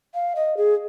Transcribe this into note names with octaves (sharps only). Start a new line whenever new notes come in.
F5
D#5
G#4